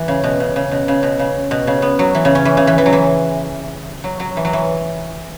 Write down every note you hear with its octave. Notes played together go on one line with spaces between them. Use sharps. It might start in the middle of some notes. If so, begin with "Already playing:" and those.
Already playing: E3
C#3
B2
C#3
C#3
B2
C#3
B2
C#3
B2
C#3
B3
F#3
E3
C#3
C#4
E3
C#3
E3
E3
F#3
E3
F#3
F#3
E3
F#3
E3